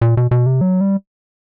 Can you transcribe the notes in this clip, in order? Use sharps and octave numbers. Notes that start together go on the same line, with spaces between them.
A#2
B2
B2
C3
F#3
G3